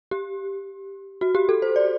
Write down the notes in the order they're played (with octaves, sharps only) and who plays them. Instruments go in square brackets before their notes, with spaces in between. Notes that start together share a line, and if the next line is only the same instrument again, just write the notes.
[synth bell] G4
F#4
G4
A4
C5
D5